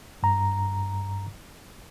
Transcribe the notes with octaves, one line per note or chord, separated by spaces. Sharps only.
G2 A#5